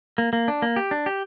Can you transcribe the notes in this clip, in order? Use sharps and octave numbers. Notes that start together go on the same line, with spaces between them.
A#3
A#3
D4
A#3
G4
D4
G4